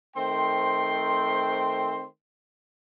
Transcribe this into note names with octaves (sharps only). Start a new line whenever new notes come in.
D#3 A3 C4 C5 G5 C6